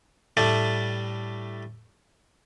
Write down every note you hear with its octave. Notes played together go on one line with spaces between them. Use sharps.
A2 G3 A3 D4